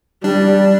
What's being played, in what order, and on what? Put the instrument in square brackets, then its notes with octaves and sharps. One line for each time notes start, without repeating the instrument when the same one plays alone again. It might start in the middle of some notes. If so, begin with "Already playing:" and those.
[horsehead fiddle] G3 [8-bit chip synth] D4